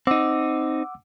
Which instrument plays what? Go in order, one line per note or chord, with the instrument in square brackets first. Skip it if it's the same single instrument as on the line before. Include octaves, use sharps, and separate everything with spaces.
[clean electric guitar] C4 D#4 [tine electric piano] F#5 D6 E6